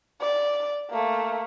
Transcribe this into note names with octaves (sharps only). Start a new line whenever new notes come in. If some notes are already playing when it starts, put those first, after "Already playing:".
D5
A3 A#3